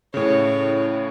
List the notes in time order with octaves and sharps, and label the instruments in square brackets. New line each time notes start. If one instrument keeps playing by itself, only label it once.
[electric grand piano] A2 C#3 [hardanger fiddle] C#5